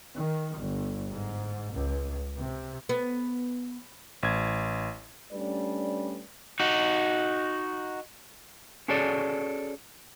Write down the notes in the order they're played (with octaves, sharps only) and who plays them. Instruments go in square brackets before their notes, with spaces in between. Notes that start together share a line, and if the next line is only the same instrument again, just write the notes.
[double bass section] D#3
G1
G#2
C#2
C3
[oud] B3
[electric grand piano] A1 G#6
[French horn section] G3 A3 C#4 D4 B4 D5
[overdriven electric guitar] D#4 F#4
[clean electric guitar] C#4 F#4 G#4 A4 C#5 D5